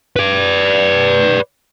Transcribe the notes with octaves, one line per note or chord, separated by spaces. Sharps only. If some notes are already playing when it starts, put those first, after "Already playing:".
B4 D5